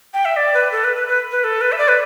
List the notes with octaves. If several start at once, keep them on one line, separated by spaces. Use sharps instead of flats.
G5
E5
D5
B4
A4
B4
B4
B4
B4
A4
B4
E5
D5
B4